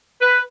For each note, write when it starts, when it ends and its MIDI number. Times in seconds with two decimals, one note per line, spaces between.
0.22 0.40 71